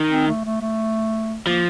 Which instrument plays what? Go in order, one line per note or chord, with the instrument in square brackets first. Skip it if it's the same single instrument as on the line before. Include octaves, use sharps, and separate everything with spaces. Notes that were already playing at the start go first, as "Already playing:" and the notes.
Already playing: [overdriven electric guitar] D#3
[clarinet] C4
A3
A3
A3
[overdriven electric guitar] F3 [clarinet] A#3